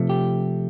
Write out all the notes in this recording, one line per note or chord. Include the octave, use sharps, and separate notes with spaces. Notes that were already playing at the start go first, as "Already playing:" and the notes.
Already playing: C3 F3 A3
G4